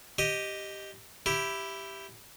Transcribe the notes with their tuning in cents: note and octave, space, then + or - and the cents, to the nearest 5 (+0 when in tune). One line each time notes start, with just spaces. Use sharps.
G4 +0 D#5 +0
E4 +5 G4 +0